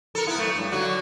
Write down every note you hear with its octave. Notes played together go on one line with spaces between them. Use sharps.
A4 A#4
B3 E4
F#2 A3
G2
D3 F#3 F#4